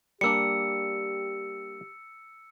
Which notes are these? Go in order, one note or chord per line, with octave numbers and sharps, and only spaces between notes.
G3 A#3 D4 G4 E6 C#7